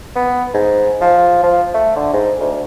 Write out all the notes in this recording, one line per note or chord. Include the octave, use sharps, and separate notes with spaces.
B3
G#2
F3
F3
A3
D3
G#2
D2